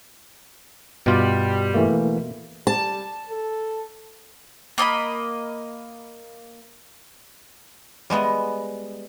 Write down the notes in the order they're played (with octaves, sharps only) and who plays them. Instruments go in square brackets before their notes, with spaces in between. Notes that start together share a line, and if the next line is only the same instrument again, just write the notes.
[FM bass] G2 [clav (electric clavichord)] B2 F4 [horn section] G3
[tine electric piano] E3 A3 A#3
[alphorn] G3 [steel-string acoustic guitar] A5
[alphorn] A4
[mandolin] A#3 D#5 A5 B5
[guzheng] G3 G#3 B3 D#5